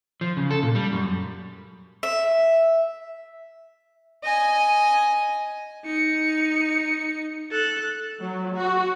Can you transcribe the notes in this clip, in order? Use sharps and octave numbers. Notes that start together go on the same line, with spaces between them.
F3
C#3
A4
A#2
G3
F#2
E5
D#5 G#5
D#4 C#7
A4 F#6
F#3
F#4